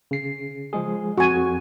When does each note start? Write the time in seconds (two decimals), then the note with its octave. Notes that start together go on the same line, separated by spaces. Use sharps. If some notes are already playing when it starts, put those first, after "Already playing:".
0.11 C#3 C7
0.73 F3 G#3 G#4
1.18 F2 F#4 G#5